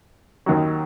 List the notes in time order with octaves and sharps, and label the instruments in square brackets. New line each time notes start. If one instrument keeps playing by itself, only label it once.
[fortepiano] D#2 D#3 F#3